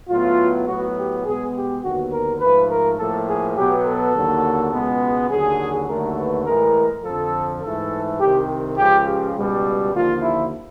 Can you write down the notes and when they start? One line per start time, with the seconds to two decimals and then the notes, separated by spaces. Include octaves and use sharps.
0.09 A2 F#3 B3 F4
0.67 A2 F#3 B3 F#4
0.96 G4
1.25 B2 G#3 B3 G#4
1.54 G4
1.83 D#2 D3 F#3 B3 F#4
2.12 A#4
2.40 G#2 F3 A3 B4
2.70 A#4
2.98 A2 F3 A#3 A4
3.27 G#4
3.56 B2 F#3 B3 G4
3.85 A4
4.14 D#2 D3 F#3 A#3
4.73 C#2 B2 G#3 B3
5.30 D#2 D3 F#3 G#4
5.88 D#2 D3 F#3 A3 A#4
6.18 B4
6.46 A2 E3 G#3 A#4
7.03 F2 D3 F3 A4
7.62 G#2 E3 A3 A4
8.19 C2 C3 D#3 G4
8.77 C#2 C#3 F3 G4
9.07 G4
9.35 C#2 B2 G3
9.93 D#2 D3 F3 A#3 F4
10.22 E4